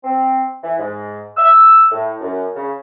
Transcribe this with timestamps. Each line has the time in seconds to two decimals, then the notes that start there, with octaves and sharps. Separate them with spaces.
0.04 C4
0.63 E3
0.78 G#2
1.37 E6
1.92 A2
2.21 F#2
2.56 C#3